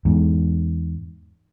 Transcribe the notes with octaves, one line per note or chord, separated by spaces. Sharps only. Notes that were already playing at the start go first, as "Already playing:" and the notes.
E2 G#2